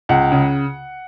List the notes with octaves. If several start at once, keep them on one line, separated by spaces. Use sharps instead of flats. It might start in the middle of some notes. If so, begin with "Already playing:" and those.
C#2 F#5
C#3